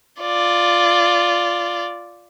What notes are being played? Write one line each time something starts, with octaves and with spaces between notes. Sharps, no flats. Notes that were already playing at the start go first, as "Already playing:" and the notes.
F4 D5